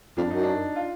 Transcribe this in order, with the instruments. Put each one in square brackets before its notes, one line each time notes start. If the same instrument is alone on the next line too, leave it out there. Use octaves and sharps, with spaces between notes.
[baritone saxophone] F2 [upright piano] D4
[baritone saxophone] F#2 [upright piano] D#4
[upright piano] D4
F4